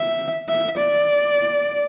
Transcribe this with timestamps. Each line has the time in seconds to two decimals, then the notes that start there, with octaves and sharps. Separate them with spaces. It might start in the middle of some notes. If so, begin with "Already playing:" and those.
Already playing: E5
0.49 E5
0.78 D5